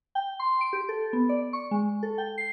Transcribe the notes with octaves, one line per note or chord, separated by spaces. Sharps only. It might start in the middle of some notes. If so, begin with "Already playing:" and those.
G5
C6
D7
G4
A4
B3
D5
C#6
G#3
A4
G5
C7